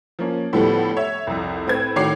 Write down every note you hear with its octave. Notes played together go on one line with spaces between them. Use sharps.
F3 A#3 C#4
A2 D3 F3 G3 B3 A4
C#5 E5
C2 F2
A2 C4 B4 G#6
A2 D#3 F#4 C#5 D6 C7